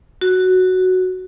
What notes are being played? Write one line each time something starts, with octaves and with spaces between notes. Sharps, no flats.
F#4